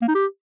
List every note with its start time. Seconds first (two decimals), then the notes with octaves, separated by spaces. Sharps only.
0.02 A#3
0.08 D#4
0.15 G4